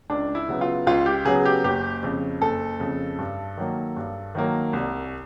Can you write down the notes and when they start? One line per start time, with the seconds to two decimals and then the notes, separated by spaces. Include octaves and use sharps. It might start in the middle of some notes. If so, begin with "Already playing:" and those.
0.10 C#2 D4
0.35 E4
0.49 C#3 F#3 B3
0.61 F4
0.87 C#2 F4
1.06 G4
1.25 C#3 F#3 B3 G#4
1.45 G4
1.64 F#1 G4
2.03 F2 C#3
2.41 F#1 A4
2.80 F2 C#3
3.19 G2
3.57 D#3 F#3 A#3
3.96 G2
4.35 D#3 F#3 A#3
4.73 C2